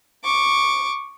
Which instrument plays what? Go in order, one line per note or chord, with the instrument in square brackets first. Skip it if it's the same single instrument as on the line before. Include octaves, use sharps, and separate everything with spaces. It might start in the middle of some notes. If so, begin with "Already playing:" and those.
[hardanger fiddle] C#6 D6